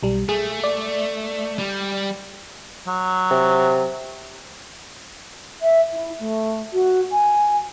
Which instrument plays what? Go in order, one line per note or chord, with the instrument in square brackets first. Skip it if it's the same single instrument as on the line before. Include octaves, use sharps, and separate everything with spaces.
[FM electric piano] B1 G3
[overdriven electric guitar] A3 [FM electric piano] G#4
[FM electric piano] D5
[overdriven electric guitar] G3
[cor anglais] F#3
[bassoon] C3
[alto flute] E5
E4
A3
F#4
G#5